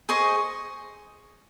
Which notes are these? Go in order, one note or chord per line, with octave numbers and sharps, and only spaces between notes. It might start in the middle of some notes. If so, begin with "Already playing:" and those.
G#4 C5 D#5 C#6